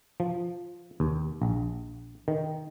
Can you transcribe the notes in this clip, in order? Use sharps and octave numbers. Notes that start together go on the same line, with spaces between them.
F3
D#2
A#1
D#3